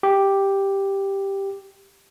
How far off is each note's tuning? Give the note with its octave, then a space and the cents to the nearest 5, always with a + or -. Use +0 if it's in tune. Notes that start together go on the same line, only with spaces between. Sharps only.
G4 +0